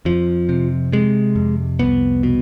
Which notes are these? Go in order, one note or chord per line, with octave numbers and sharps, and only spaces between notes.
F2 F3
C3
C3 G#3
F2
C2 B3
B2